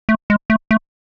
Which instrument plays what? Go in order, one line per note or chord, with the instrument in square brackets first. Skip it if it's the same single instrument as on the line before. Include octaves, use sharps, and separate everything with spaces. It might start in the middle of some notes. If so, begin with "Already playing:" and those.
[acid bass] A3
G#3
A3
A3